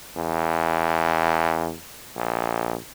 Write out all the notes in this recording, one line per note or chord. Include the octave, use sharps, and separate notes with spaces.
E2
A#1